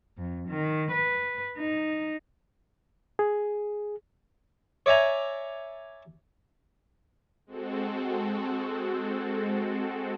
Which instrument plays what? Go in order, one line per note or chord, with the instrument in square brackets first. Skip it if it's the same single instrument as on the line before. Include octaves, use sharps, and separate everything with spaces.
[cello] F2
D#3
B4
D#4
[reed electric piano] G#4
[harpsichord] C#5 D5 E5 G#5 A#5
[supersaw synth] G#3 C4 F#4 A4